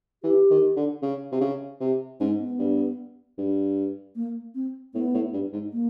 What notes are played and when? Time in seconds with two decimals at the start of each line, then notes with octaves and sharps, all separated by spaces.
0.23 E3 G4
0.50 D#3
0.76 D3
1.02 C#3
1.32 C3
1.41 C#3
1.80 C3
2.20 G#2 C#4
2.40 B3
2.59 G2
3.38 G2
4.16 A#3
4.55 C4
4.94 A2 B3
5.14 A2
5.33 G2
5.53 G#2
5.73 A#3